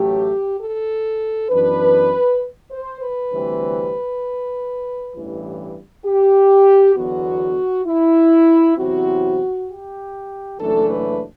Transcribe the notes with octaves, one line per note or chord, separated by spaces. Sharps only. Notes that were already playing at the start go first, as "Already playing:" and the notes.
Already playing: A1 A2 F#3 A3 G4
A4
F#2 E3 B3 D4 B4
C5
B4
D2 C3 E3 G3 C4
A1 G2 E3
G4
E2 D3 F#3 B3 F#4
E4
E2 C3 F#3 C4 E4 F#4
G4
F#1 F#2 E3 A3 D4 A4
B4